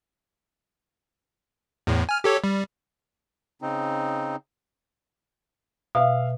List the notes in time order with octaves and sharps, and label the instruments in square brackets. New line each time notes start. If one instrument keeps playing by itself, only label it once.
[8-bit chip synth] E2 A2
G#5 F6
G4 A4 C#5
G3
[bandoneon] C#3 C4 D#4
[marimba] B2 [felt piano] E5 F5